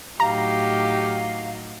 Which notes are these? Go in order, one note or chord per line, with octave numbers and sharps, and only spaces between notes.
A2 F#3 D#4 G4 F5 A#5